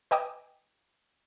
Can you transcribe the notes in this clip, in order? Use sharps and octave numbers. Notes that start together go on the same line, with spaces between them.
B4 D#5 G5 G#5 D6 D#6